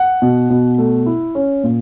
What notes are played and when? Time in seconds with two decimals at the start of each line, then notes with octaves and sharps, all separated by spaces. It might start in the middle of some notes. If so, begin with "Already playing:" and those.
Already playing: F#5
0.22 B2
0.50 B2
0.78 A3
1.06 E4
1.35 C#4
1.64 A#2